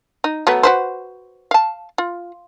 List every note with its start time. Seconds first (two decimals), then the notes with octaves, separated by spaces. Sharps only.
0.24 D#4
0.47 F#3 A3 B3
0.63 F#4 B4 C5
1.51 F5 A5
1.98 F4